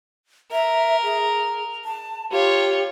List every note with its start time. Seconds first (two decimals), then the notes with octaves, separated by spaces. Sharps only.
0.52 A#4 E5
1.03 G#4
1.85 A5
2.31 F4 G4 C#5